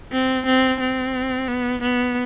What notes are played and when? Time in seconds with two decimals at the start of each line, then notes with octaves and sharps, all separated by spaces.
0.12 C4
0.46 C4
0.81 C4
1.48 B3
1.82 B3